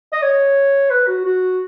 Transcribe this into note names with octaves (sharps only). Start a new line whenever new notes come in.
D#5
C#5
B4
F#4
F#4